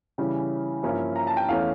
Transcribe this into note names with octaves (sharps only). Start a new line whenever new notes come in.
C#3 E3 G3 C#4 E4
G2 F3 A#3 C#4 E4
A#5
A5
G5
E2 E3 A3 C#4 F5